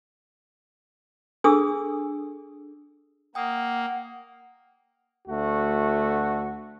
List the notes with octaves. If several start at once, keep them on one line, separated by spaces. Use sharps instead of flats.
D4 G#4 A4 C#6 D#6 E6
A#3 F#5 G5 D#6
D2 A3 F#4